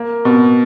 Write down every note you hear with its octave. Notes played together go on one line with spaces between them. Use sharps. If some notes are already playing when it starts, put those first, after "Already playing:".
Already playing: A#3
B2